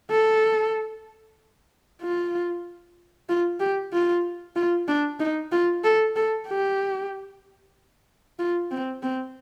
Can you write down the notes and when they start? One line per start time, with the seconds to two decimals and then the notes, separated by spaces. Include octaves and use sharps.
0.11 A4
2.01 F4
3.29 F4
3.60 G4
3.93 F4
4.56 F4
4.88 D4
5.20 D#4
5.52 F4
5.84 A4
6.16 A4
6.48 G4
8.39 F4
8.71 C4
9.03 C4